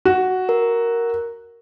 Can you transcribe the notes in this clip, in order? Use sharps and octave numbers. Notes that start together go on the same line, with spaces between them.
F#4
A#4